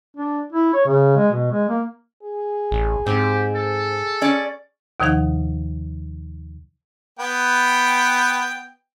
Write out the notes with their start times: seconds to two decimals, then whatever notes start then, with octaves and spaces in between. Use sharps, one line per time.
0.17 D4
0.53 E4
0.74 C#5
0.86 C#3
1.17 G#3
1.32 B2
1.52 G#3
1.69 A#3
2.23 G#4
2.71 A1
3.06 G#2 C4 G4
3.55 A4
4.21 C#4 D5
5.00 D#2 C3 D#3 F3 D#4 F#5
7.19 B3 B4 G5